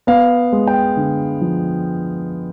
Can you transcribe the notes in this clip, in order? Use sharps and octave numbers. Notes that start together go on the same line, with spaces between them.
B3 F5
G#3
G5
D3
F3